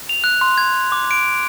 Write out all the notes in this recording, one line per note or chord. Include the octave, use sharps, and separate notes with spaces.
F7
F#6
C6
G#6
D6
D7